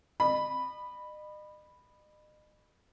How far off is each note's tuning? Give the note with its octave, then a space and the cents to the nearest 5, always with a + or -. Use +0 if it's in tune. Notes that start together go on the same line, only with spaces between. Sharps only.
D#5 -40 B5 +0